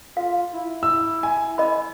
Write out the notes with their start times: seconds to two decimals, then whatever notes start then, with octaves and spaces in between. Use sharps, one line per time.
0.17 F4 F5
0.53 E4
0.83 E4 E6
1.23 G#5
1.58 D#5 B5